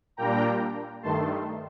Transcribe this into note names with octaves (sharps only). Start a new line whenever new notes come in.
A#2 G3 A#3 D4 G5 A#5
G2 D#3 A3 A5 C6